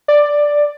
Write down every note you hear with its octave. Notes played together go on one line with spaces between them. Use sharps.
D5